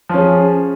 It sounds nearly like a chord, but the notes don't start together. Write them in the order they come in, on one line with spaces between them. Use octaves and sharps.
F3 C#4 G#4